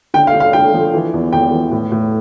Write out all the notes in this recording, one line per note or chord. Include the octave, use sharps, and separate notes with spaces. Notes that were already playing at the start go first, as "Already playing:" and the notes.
D3 G5
F5
D3
F5
D3 G5
F3
E3
E2
E2 G5
E3
A2
A2